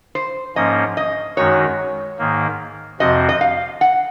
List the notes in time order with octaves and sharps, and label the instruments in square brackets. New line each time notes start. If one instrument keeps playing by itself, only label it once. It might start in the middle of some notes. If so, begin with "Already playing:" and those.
[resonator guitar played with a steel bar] C5
[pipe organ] G#2 F3 A#3 C#4 [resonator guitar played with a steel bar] D#5
[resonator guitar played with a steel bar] D#5
[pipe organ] F#2 D#3 G#3 D#4 F#4 [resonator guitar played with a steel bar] C#5
[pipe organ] G#2 D#3 A#3
[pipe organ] F2 C3 F3 C4 F#4 [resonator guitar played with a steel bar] D#5
[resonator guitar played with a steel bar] D#5
F5
F#5